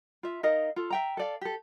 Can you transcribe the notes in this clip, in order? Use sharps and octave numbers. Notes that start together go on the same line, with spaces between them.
F4 E5
D#4 A#4 D#5 F5
F4 A4
E5 G5 A#5
A4 D5 F5
G4 A4